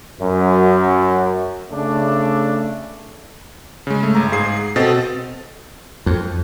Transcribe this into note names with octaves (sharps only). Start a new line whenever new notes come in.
F#2
C#3 A3 D4 D5 A5
C#3 G#3
A3
G1 A#5
G#2 G#4 F5 C7
C7
B2 C4 A4 D#5 A6
F2